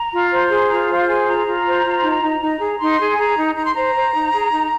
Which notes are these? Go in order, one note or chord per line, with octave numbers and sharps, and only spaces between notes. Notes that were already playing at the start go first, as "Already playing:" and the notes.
Already playing: A#5
F4
C5
G#4
F4 A#5
C5 F5
G#4 G#5
F4 A#5
F4
C5
F4
D#4
D#4
D#4
G#4
D#4 C6
G#4
G#5
G#4 A#5
D#4
D#4 A#5
C6
C5 A#5
C5
D#4
G#4
D#4